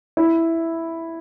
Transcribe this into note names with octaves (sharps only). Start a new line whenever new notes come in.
E4